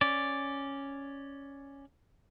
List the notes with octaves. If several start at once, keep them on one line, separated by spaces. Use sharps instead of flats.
C#4 D5